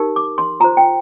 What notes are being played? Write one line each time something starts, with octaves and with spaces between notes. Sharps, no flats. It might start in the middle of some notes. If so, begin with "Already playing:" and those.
Already playing: D#4 G4 A#4
D6
C6
F4 C5 A#5
G5